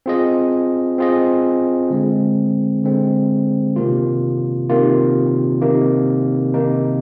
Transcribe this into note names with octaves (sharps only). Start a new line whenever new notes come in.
C4 F4 G#4 D#5
C4 F4 G#4 D#5
D3 G#3 C4
D3 G#3 C4
C3 D#3 A#3 F4
C3 D#3 A#3 F4
C3 D#3 A#3 D#4
C3 D#3 A#3 D#4